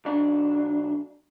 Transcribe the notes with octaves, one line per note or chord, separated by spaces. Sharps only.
B1 D4